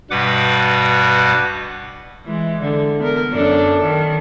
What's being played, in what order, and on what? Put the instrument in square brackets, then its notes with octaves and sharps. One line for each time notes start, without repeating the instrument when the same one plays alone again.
[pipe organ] G2 B2 G3 B4 F#5 D6
[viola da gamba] E3 G#3
D3
B3 A#4
F#2 D4 A4
D#3